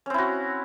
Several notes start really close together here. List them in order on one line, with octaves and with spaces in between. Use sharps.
C#4 C4 E4 F#4